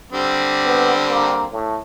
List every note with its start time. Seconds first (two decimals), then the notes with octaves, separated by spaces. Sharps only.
0.13 D3 G3 C4
0.66 B3
1.08 A#3
1.52 A2